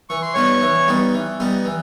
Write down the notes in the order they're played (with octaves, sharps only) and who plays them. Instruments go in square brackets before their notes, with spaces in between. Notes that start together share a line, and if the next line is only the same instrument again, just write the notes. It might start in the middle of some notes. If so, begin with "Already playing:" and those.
[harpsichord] E3 [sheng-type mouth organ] C#6
[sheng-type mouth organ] C6
[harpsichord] G3 B3 D#4 [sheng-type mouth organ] C#5 C#6
[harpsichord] E3
G3 B3 D#4
E3
G3 B3 D#4
E3